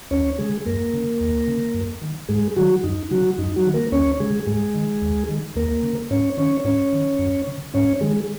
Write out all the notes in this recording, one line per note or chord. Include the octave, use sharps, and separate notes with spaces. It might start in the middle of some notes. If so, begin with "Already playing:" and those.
D#2 C#4 C#5
C#3 G#3 G#4
F#2 A#3 A#4
C#3
D#2
C#3
F#2
D#3
G#2 G#3 G#4
D#3 F#3 F#4
F#2 D#4
C#3 F#3 F#4
F#2 D#4
F#3 F#4
D#3
A#3 A#4
D#2 C#4 C#5
C#3 G#3 G#4
G#2 G#3 G#4
D#3
D#2
D#3
D#2 A#3 A#4
C#3
G#2 C#4 C#5
D#3 C#4 C#5
G#2 C#4 C#5
D#3
F#2
C#3
G#2 C#4 C#5
D#3 G#3 G#4